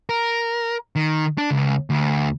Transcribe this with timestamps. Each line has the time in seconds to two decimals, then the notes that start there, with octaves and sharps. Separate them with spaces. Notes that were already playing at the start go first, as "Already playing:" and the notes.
0.10 A#4
0.96 D#3
1.38 D4
1.51 C#2
1.90 D2